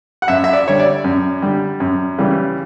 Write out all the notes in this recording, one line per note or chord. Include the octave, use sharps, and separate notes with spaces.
F#5
F#2 E5
E5
D5
D3 G3 C#5
D5
F#2
D3 G3
F#2
C#3 E3 G3